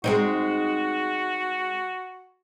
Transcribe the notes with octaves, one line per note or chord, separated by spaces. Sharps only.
G#3 C4 D#4 F#4